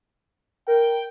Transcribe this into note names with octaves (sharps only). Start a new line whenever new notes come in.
A#4 G5